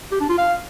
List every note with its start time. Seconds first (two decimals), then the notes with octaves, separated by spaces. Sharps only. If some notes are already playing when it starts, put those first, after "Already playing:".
0.12 G4
0.21 D4
0.29 F4
0.38 F5